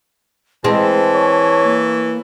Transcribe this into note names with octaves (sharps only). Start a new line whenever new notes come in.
E3 G#3 C4 A5
C#5
A#3